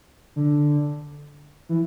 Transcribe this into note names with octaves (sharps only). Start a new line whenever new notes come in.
D3
E3